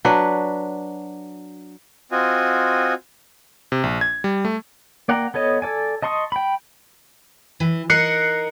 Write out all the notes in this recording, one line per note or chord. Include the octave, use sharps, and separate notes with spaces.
F#3 D4 B4
C4 F4 F#4 D#5 G#5
C3
A#1
G#6
G3
A3
A#3 D5 F#5 G5 A#5
B3 A4 C#5 D#5
A4 D5 G#5
D#5 A5 C6 C#6 D#6
G5 B5
E3
D#4 A#4 F#6 C7 C#7